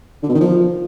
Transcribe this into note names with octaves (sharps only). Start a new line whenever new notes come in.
D3
B2
D#3
F3